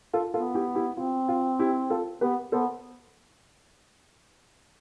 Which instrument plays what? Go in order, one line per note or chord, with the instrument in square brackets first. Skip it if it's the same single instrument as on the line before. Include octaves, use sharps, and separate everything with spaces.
[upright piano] F4 A4
[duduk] B3 [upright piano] F4 A4
[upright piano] E4 G4
E4 G4
[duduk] C4 [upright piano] F4
[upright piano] F4
E4 G4
F4 A4
[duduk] B3 [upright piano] G4 B4
[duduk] B3 [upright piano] A4 C5